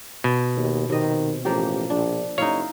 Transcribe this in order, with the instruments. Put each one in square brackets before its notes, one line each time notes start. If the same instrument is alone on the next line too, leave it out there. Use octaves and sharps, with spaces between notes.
[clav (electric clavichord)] B2
[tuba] D#2
[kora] C3 D#5 [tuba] D#3
[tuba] A1 [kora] F3 A#3 G4
[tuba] A#1 [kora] D4
[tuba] F#1 [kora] D#4 E4 F5 [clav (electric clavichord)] C#5